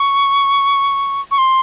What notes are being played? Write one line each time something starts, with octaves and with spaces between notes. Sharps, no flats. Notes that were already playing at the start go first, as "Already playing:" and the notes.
Already playing: C#6
C#6
C6